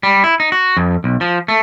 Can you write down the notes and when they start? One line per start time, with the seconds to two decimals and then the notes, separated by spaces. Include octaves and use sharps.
0.03 G3
0.24 E4
0.40 D#4
0.52 F#4
0.77 F2
1.04 B1
1.21 F3
1.48 A3